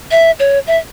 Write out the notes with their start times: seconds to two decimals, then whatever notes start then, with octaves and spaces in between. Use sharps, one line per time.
0.11 E5
0.40 C#5
0.67 E5